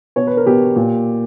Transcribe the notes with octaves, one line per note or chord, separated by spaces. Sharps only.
B2 C#5
B4
A#4
B2 G4
A#2